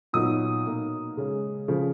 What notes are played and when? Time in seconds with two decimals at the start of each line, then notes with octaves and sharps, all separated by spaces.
0.13 A#2 F#3 B3 D#4 D#6
0.66 B2 A#3 D#4
1.17 C#3 G#3 C#4
1.68 C#3 F3